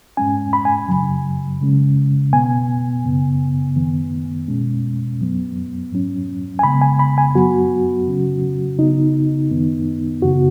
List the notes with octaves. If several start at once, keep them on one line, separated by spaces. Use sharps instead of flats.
G#2 G#3 C#4 G#5
B5
G#5
F#2 C#3 F#3
C#3 G#3 C#4
B2 B3 G#5
F#2 C#3 B3
F#2 D#3 B3
B2 G#3 C#4
F#2 F#3 B3
G#2 F#3 C#4
G#5
C#3 G#3 B3 B5
G#5
B5
G#5
F#2 F#3 B3 F#4
C#3 F#3 C#4
C#3 B3 D#4
F#2 D#3 B3
F#2 C#3 B3 F#4